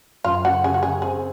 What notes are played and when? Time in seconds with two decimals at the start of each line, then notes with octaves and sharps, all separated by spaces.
0.24 F#2 F4
0.45 C#3 F#4
0.64 C#3 G#4
0.74 F#4
0.83 C#3 G#4
1.02 C4 G#4